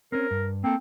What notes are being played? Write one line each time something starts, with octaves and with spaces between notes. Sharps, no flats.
C4 C#4 A#4
G2
A#3 C4 A4